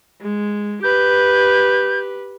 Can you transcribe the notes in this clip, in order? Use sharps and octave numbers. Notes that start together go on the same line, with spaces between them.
G#3
G4 B4 G6